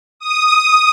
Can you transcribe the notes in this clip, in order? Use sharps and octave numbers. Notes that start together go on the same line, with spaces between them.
D#6